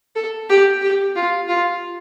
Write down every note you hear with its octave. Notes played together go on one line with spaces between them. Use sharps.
A4
G4
G4
F4
F4